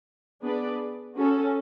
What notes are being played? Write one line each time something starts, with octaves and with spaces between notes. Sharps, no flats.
B3 D4 G#4 B4 D5
C#4 F#4 A4